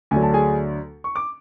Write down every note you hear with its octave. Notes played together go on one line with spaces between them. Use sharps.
D2 D3 F#3 G#5
A5
G#4 G#5
C#6
D6